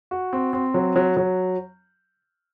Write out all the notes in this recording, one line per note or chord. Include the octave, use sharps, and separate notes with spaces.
F#4
C4
C4
F#3
F#3
F#3